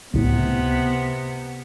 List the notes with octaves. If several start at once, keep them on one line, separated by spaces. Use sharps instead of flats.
C#2 A2 C3 B3